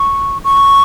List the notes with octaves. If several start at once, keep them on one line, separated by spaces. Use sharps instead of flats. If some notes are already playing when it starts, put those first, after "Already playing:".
Already playing: C#6
C#6